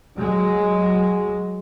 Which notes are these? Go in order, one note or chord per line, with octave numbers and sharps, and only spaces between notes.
F#3 G#3